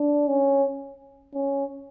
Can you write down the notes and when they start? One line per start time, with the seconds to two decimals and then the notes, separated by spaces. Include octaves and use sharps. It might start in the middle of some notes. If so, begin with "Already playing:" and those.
Already playing: D4
0.28 C#4
1.34 C#4